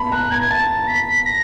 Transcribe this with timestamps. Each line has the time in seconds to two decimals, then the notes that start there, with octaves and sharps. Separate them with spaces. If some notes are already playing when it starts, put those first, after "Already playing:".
Already playing: A5 B5
0.12 A#5 F#6
0.31 A#5 G#6
0.41 G#6
0.50 A5 A6
0.87 B6
1.26 A#6